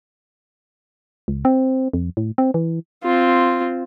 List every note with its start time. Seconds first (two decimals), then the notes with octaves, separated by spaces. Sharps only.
1.28 C#2
1.45 C4
1.93 F2
2.17 A2
2.38 C4
2.54 E3
3.03 C4 F4